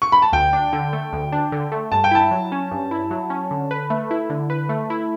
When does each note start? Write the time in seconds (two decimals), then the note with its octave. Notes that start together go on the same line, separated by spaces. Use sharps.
0.02 C#6
0.12 B5
0.22 A5
0.33 D2 G5
0.53 D4
0.73 D3
0.93 A3
1.13 D2
1.32 D4
1.52 D3
1.72 A3
1.92 G2 A5
2.04 G5
2.11 E4 A5
2.31 F#3
2.52 C#4
2.71 G2
2.91 E4
3.11 F#3
3.30 C#4
3.51 D3
3.71 B4
3.90 A3
4.11 E4
4.30 D3
4.50 B4
4.69 A3
4.90 E4